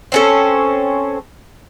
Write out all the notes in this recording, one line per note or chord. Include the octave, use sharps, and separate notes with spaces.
C4 C#4 A4